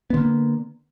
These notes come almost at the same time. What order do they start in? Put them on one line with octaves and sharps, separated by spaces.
B3 D3 A#3